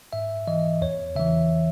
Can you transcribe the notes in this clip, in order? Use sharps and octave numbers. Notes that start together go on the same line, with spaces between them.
G#2 E5
E3 D#5
E2 C#5
C#3 E3 E5